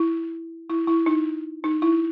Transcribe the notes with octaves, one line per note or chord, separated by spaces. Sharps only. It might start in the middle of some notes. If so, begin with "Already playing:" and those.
Already playing: E4
E4
E4
D#4
D#4
E4